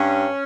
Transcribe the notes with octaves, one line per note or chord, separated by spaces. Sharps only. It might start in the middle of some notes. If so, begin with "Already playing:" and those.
Already playing: G2 C#4